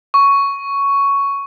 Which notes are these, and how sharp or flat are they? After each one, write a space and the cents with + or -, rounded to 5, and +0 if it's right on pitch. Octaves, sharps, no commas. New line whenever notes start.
C#6 +5